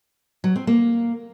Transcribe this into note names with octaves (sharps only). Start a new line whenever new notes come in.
F#3
C4
A#3